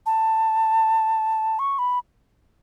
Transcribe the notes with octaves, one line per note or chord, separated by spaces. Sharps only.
A5
C#6
B5